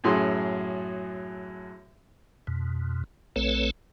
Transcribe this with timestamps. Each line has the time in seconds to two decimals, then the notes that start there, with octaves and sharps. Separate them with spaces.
0.04 F#2 A2 F#3 G#4 C6
2.47 F2 B2
3.36 A#1 A3 C4 A4 B4 C#5